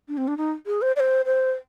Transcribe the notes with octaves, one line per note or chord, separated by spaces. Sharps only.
D4
C4
D4
D#4
G#4
C5
D5
C5
C5